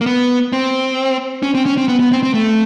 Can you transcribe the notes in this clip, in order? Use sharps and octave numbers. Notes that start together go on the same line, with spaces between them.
A#3
B3
C4
C#4
C4
C#4
C4
B3
B3
C4
C4
A3